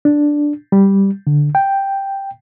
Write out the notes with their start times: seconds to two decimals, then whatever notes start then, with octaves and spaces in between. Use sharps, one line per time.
0.05 D4
0.72 G3
1.27 D3
1.55 G5